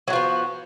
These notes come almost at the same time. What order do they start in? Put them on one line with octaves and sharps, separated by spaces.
F#3 F#4 F3 B3